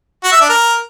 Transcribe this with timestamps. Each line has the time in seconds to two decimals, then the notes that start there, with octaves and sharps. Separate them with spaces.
0.24 F#4
0.33 E5
0.41 D4
0.49 A#4